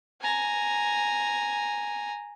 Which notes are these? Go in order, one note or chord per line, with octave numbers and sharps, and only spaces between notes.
G#5 A#5